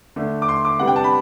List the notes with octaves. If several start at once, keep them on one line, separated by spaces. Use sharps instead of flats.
D3 A3 D4
D6
C6
D6
C3 G3 B3 D4 F#5
G5
A5
B5